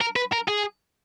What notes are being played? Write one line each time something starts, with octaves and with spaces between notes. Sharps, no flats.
A#4
B4
A#4
G#4